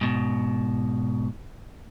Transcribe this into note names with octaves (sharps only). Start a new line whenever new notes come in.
G#2 B2